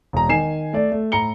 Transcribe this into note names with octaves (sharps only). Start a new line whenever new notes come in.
E1 A#5
D#3 G#5 C7 E7
A3 D5
A3
A2 A#5 C#7 G7